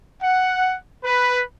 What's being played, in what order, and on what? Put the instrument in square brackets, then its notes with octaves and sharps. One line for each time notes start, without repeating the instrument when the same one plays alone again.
[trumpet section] F#5
B4